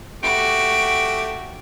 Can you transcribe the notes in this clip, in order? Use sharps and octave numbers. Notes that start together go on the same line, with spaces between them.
A3 F#4 G4 D7